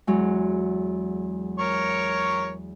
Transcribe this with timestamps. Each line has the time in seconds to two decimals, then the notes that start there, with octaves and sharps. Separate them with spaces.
0.07 E2 F#3 G#3
1.59 A#4 C#5 C#6